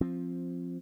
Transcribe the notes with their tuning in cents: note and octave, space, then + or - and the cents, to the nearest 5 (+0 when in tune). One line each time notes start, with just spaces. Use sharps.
F3 +0 C4 +10